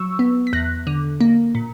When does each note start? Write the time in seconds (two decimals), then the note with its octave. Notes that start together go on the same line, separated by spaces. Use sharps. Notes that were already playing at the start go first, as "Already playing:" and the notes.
Already playing: F#3 C#6 E6
0.19 B3
0.47 B6
0.53 E2 F#6 A#6
0.87 D3
1.21 A#3
1.55 A#2